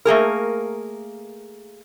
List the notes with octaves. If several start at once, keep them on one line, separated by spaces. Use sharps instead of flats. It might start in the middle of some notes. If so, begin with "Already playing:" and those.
A3 A#3 G#4 A#4